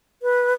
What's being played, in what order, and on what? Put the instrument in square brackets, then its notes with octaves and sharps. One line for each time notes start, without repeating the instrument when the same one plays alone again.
[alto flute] B4